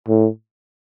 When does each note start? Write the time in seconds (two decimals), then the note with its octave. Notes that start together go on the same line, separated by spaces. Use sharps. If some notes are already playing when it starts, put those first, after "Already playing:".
0.08 A2